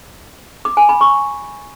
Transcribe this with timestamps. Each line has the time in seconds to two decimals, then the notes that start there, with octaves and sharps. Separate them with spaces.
0.65 D6
0.77 G#5
0.89 B5
1.01 C#6